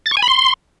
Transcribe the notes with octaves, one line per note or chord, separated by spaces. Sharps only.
A6
C#6
G#5
B5
C6